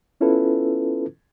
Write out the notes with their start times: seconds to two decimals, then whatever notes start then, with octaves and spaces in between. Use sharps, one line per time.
0.21 B3 C#4 E4 F4 A4 B4